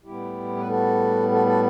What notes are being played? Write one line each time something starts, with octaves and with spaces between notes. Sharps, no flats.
A2 G3 B3 E4 G4
B4
F#4 A4
F#4 A4
F#4 A4